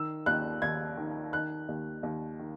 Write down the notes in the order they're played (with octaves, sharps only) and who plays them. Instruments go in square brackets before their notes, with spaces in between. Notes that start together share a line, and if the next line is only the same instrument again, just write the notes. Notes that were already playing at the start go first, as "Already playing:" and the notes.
Already playing: [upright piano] D#3 E6
D#2 F#6
D#2 G#6
D#3
D#3 F#6
D#2
D#2
D#3